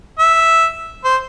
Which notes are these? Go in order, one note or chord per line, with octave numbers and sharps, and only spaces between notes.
E5
C5